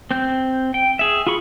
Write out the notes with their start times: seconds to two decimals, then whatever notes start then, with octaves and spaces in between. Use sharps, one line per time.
0.11 C4 G6
0.74 G5
0.99 G#4 E5
1.27 F4 G#4 B5 C#6